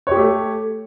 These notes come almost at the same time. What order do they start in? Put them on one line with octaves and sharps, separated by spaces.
C#5 G4 A3